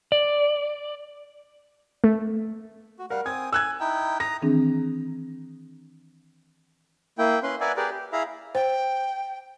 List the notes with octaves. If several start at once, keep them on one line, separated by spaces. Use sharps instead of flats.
D5
A3
F#4
G3 A#4 F5 F#5
C4 G#5 D#6 G#6
G#5 E6 F#6 G#6
D#4 E4 G5
A#5 D#6 A#6
D#3 E3 C4 D4 G#4
A#3 E4 G5
C#4 B4 C6
A#4 B4 D5 E5 F#5 G#5
G4 G#4 A#4 B4 D5
G4
E4 G#4 E5 F5 A#5 B5
C5 G5